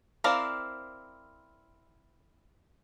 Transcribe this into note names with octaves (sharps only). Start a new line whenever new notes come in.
C4 E4 A#4 D5 F5